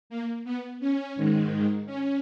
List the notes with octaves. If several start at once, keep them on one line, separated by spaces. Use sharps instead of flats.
A#3
B3
C#4
G#2 D#3 G#3
C#4